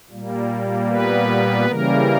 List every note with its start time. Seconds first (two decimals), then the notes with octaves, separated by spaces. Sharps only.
0.10 A#2 G3 A#3
0.89 B3 B4
1.67 C#3 E3 G3 A#3 A#4